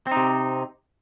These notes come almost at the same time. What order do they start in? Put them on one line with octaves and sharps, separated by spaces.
C4 D#4 C3